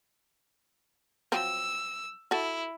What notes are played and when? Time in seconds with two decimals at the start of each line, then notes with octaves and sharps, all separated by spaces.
1.32 F3 F#3 C4 E6
2.31 E4 F#4 A4